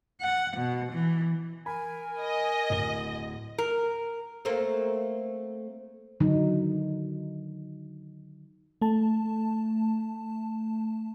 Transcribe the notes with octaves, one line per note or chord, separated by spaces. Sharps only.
F#5
B2
E3
A#4 G#5 B5
D#5
D1 G7
A#4
A3 A#3 C4
D3 D#3 F#3 D#4
A3 A5